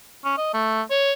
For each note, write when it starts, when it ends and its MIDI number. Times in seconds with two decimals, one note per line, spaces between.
0.24 0.36 61
0.37 0.53 75
0.54 0.82 57
0.91 1.13 73